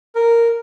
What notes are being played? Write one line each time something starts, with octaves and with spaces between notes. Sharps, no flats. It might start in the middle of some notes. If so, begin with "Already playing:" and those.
A#4